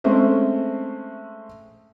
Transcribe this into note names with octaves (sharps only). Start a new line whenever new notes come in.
G#3 A3 C4 C#4 E5